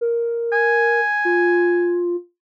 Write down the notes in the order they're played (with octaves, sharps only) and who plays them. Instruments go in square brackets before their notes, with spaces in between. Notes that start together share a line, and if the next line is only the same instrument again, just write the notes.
[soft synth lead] A#4
[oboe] G#5
[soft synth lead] F4